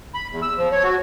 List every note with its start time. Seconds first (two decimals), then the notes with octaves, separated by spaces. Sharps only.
0.14 B5
0.31 E2
0.42 E6
0.57 F3
0.72 C#5
0.83 F#4